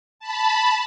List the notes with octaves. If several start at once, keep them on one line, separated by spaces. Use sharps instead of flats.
A5 B5